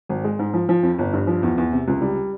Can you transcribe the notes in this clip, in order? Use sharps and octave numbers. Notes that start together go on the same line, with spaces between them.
G#1
G#3
G#2
F3
F3
F2
G1
G2
F3
E2
E2
C3
C#2
G3